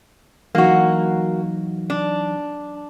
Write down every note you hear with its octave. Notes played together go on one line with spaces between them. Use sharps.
E3 F#3 A#3 D#4 F#4
D4